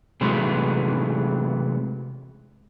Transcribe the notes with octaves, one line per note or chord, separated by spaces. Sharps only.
C3 E3 F#3 G#3 A3 B3